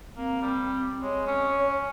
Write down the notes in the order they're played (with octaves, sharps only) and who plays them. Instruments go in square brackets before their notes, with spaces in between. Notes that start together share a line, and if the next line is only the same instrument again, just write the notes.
[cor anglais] A#3 [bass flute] C4
[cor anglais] G3
[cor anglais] G#3 [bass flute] C#5
[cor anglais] C#4